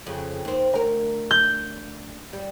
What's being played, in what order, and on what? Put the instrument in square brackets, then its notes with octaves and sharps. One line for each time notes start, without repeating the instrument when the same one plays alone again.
[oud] F2 C#3
D#2 C4
D2 A#4
[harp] G6
[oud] G3